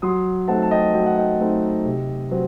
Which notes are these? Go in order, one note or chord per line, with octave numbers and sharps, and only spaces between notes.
F#3 C6 D#6
A3 C4 D#4 F#5 A5
A5
D#5 G5
F#3 G5
F#5
D#5 G5
A3 C4 D#4
C3
F#3 C4